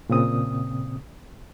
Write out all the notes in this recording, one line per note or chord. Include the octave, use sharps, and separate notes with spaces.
A#2 C#3 C4 D#6